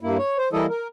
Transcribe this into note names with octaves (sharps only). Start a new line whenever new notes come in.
G2 A#3 E4
C#5
C5
E3 G3 A#3 E4 A4 D#5
A#4